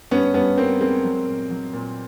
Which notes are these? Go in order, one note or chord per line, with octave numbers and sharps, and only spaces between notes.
G2 B3 C#4
G2 B3 C#4
G2 A#3 C4
G#3 A#3 C4
F#3
A#2
F#3
A#2